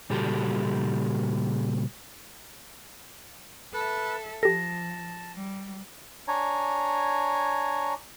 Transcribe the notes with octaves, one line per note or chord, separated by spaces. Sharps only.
A#2 C#3 G3 F#4 G4 A4
A4 B4 E5
F3 G4 A4 A5 A#6
G3
D4 C#5 G#5 A#5